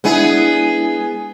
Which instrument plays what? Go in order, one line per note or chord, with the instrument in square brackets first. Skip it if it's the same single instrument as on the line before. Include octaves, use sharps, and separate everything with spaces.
[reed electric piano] G#3 D4 E4 [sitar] B3 G#4